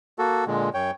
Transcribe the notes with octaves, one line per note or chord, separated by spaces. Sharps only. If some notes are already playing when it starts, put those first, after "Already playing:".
A#3 F#4 A4
A#2 D3 G#3
F#2 C#5 G5